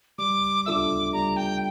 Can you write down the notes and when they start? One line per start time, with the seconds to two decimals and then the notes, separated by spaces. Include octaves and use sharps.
0.18 G3 D6
0.66 D4 F4 A4 E5 D6 E6
1.13 G3 A#5
1.36 G5